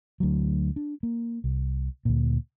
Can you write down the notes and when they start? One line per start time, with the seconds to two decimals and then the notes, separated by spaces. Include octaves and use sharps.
0.20 D2 F#3
0.76 D4
1.03 A#3
1.44 C2
2.05 D2 A#2